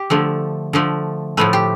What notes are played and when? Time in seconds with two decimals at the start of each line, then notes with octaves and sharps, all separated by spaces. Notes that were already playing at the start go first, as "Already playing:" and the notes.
Already playing: G4
0.10 D3 F3 A3
0.73 D3 F3 A3
1.37 A2 F3 A3 B4
1.53 G4